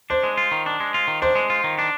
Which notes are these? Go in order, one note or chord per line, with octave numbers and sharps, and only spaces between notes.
D4 C5
G#3
F4
D#3
D4
G#3
F4
D#3
D4 C5
G#3
F4
D#3
D4